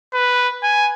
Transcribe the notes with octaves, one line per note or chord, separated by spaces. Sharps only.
B4
G#5